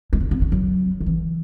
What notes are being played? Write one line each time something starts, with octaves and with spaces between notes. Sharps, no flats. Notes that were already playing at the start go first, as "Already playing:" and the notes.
G#3
A3
B3
A3
F#3
D#3
E3